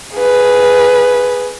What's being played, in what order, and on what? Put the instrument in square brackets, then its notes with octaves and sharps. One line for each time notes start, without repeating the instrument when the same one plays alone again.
[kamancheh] G#4 B4